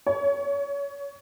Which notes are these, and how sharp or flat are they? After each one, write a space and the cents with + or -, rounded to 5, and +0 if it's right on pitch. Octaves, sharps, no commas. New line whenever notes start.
C#5 +25